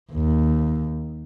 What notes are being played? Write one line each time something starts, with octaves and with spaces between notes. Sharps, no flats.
D#2